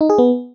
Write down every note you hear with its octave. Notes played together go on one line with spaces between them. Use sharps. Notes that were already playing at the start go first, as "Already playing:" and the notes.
D#4
G#4
B3